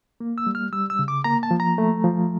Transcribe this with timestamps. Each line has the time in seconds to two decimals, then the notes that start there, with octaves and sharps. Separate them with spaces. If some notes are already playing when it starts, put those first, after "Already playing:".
0.20 A#3
0.38 E6
0.47 G3
0.55 F6
0.72 G3 E6
0.90 E6
0.99 C#3
1.08 D6
1.24 A#3 A#5
1.43 A5
1.51 F3
1.60 A#5
1.78 A3
2.04 F3